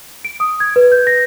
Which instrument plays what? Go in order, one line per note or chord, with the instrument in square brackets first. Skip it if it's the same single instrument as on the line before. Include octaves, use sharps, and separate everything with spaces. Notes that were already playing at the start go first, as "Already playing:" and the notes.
[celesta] D7
D#6
G#6
B4
G6
A#6